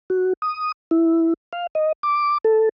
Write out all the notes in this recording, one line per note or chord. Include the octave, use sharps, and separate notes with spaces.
F#4
D#6
E4
F5
D#5
D6
A4